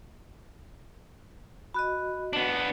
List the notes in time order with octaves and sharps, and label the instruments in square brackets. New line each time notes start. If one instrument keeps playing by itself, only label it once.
[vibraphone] F#4 D#5 [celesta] B5 F#6
[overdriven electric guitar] B3 D4 [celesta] F#7